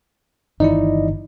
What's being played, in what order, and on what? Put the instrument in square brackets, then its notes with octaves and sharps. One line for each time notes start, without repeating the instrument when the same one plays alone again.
[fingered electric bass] G1 D#3 E3 [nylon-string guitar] D#4 [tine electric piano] E4 D5 D#5